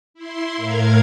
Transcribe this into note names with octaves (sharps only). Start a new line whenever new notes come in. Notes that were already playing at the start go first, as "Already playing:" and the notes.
E4 C6
A2 A#4 F5 G#6